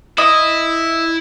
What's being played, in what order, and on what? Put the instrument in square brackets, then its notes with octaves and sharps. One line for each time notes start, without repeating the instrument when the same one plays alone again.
[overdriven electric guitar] E4 [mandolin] D#5